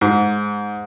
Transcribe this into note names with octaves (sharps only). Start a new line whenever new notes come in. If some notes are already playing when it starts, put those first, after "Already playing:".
G#2